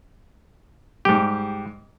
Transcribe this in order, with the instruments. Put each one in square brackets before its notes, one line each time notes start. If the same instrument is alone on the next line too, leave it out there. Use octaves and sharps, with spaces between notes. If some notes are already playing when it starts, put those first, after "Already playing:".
[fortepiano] G#2 G3 [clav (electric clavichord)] G4